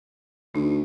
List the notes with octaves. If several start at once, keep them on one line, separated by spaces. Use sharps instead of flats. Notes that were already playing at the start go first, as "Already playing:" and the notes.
D2 D#4